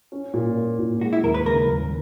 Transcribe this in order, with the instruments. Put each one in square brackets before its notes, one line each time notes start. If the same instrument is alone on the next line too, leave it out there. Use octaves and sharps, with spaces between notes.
[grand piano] C#4
A#2
A#3
A#2
[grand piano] G#3 [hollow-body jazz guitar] F#4
[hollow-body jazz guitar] E4
[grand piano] D#2 [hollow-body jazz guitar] A#4
[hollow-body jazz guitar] B4
[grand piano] C#3 [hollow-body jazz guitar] A#4
[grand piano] D#2